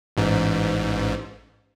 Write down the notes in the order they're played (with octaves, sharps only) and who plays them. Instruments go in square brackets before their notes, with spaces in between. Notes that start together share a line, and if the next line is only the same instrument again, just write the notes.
[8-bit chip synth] A1 G#2